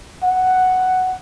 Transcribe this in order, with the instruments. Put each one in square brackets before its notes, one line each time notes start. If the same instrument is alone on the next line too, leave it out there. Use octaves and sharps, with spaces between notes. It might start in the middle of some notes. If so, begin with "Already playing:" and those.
[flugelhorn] F#5